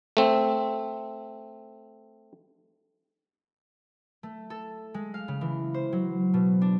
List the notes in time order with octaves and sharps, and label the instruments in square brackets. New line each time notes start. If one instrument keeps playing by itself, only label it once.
[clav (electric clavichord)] A3 C4
[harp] A3
A4
G#3
F5
C#3
E3
C5
F#3
B2
D4